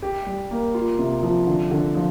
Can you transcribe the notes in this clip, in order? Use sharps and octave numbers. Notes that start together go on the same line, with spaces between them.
G4
G3
A#3
F4
C3
F3
D3
D3
F3